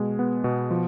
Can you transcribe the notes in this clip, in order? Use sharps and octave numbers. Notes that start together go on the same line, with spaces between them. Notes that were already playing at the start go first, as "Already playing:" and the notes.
Already playing: B2 G#3
B3
B2
F3